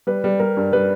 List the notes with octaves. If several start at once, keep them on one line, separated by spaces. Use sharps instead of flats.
G3 B4
G3
G3 A#4
G2
G3 B4